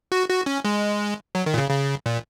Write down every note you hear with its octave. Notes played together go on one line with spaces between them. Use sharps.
F#4
F#4
C#4
G#3
F#3
D#3
A#2
C#3
C#3
A#2